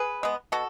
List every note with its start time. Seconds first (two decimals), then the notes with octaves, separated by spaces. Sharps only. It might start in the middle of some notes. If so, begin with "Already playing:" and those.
Already playing: G#4 B4
0.23 G#3 B3
0.52 B2 F#4 A4